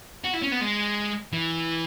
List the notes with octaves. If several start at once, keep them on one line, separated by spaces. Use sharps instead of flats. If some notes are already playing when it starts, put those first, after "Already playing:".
F#4
E4
C#4
B3
G#3
E3